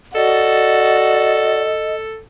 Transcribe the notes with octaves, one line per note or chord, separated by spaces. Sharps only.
F#4 A4 D5 D#5